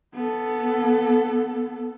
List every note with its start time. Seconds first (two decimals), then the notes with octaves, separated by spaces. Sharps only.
0.14 B3 A4